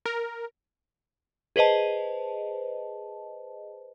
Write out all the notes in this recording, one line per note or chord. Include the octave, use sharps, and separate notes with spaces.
A#4
G#4 B4 C5 D#5 A5